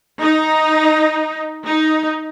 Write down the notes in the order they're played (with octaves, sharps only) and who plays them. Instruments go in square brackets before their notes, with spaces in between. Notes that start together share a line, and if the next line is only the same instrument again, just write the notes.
[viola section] D#4
D#4